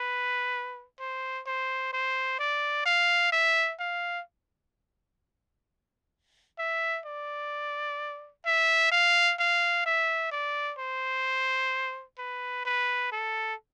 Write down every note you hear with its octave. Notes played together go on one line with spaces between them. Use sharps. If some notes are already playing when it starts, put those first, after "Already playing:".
Already playing: B4
C5
C5
C5
D5
F5
E5
F5
E5
D5
E5
F5
F5
E5
D5
C5
B4
B4
A4